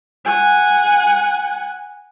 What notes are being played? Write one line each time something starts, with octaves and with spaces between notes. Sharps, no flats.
F#5 G#5